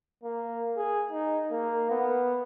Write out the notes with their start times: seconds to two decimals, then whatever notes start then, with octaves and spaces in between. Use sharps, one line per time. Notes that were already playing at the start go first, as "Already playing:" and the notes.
0.23 A#3
0.77 G#4
1.11 D#4
1.51 A#3
1.90 B3